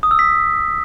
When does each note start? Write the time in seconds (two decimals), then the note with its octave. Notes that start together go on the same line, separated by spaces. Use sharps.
0.03 D#6
0.11 E6
0.19 B6